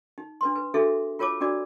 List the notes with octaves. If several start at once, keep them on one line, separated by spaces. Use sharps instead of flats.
D#4
D4 B4 C6
B4
D4 E4 F#4 G#4 A4 E5
F4 A#4 C#5 A5 D6
D4 F#4 A#4 D5 D6